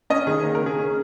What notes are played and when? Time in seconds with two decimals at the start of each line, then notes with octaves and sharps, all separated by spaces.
0.10 C#4 D#5
0.27 D#3 G#4
0.43 A#3
0.55 A#4
0.60 C#3
0.66 G#4
0.78 C#4